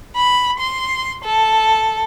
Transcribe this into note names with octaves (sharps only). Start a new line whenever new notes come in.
B5
C6
A4